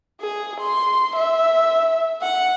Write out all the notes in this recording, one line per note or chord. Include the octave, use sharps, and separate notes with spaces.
G#4
C6
E5
F#5